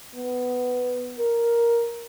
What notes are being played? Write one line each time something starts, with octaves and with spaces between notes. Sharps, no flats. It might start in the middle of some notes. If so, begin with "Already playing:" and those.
B3
A#4